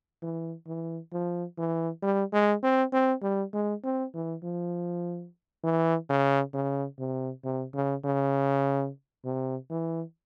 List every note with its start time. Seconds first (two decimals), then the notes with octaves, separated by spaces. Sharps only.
0.22 E3
0.67 E3
1.13 F3
1.58 E3
2.03 G3
2.33 G#3
2.63 C4
2.93 C4
3.22 G3
3.54 G#3
3.84 C4
4.14 E3
4.43 F3
5.64 E3
6.10 C#3
6.54 C#3
6.99 C3
7.44 C3
7.74 C#3
8.04 C#3
9.25 C3
9.70 E3